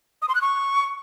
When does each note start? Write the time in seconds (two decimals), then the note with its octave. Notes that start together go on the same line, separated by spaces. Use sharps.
0.22 D#6
0.29 C6
0.35 F#6
0.42 C#6